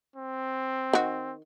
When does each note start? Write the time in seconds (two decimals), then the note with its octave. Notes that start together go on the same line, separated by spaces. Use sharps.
0.16 C4
0.93 D#3 F#4